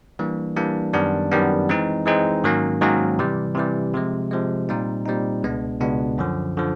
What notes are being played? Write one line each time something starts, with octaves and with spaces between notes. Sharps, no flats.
E3 G3 A#3 D4
E3 G3 A#3 D4
F#2 D#3 G3 B3 D4
F#2 D#3 G3 B3 D4
E3 G#3 C4 D#4
E3 G#3 C4 D#4
G#2 D#3 F#3 A#3 C#4
G#2 D#3 F#3 A#3 C#4
C3 E3 G3
C3 E3 G3
C3 F3 G#3
C3 F3 G#3
A#2 G3 C4 D#4
A#2 G3 C4 D#4
C#2 B2 G#3 B3 D4
C#2 B2 G#3 B3 D4
F#2 D3 F3
D3 F3